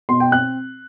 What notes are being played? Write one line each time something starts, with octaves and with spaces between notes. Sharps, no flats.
B2 C6
G5
C4 F#6